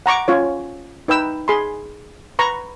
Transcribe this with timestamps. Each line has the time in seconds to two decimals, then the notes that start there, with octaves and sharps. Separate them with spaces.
0.06 F#5 A#5 C#6 D6
0.28 C#4 F4 C#5
1.08 D#4 B4 G5 E6
1.48 G#4 B5 C6
2.39 B4 A#5 C#6